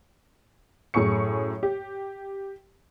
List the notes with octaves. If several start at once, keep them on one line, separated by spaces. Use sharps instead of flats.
F#2 A2 G#4 C#6 C#7
G4